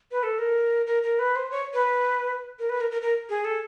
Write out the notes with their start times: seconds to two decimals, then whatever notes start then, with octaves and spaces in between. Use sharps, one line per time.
0.11 B4
0.23 A4
0.39 A#4
0.87 A#4
1.03 A#4
1.19 B4
1.36 C5
1.51 C#5
1.74 B4
2.59 A#4
2.69 B4
2.81 A#4
2.91 A#4
3.02 A#4
3.29 G#4
3.45 A4